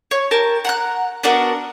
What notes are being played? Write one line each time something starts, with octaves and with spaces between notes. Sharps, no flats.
C#5
G4 A#4 A5
F#5 A#5 F#6
B3 D4 F#4 A#4